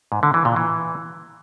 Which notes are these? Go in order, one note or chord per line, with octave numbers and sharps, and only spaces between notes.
G#2
D3
E3
A#2
E3